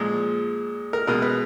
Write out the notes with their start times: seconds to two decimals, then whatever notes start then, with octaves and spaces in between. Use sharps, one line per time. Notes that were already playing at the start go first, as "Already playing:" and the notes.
Already playing: A#2 F3 G#3
0.93 A#4
1.07 B2 G#3 A#4
1.22 B4